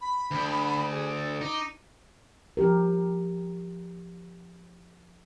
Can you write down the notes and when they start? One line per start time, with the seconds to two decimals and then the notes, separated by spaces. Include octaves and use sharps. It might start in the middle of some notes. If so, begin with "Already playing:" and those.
0.01 B5
0.31 D2
0.90 G#4
1.15 A4
1.41 D#4 D6
2.57 F3 G4 A#4